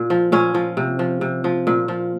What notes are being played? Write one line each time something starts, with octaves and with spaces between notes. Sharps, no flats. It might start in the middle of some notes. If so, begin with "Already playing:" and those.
Already playing: A#2
F3
A#2 C#4
F3
C3
F3
C3
F3
A#2
F3